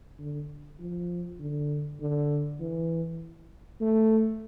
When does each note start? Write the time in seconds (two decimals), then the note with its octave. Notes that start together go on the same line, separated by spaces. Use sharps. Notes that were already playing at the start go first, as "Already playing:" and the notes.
0.19 D3
0.79 F3
1.40 D3
2.00 D3
2.60 E3
3.81 A3